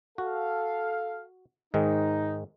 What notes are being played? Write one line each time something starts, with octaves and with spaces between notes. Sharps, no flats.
F#4 A4 F5
G#2 D#3 G#3 D#4